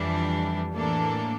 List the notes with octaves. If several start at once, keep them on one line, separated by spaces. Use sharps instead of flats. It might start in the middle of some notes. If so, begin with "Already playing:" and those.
Already playing: F2 E3 G3 D4
A2 E3 A#3 D4 A4